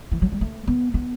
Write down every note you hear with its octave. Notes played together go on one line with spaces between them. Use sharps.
E3
F#3
G3
A3
B3
B3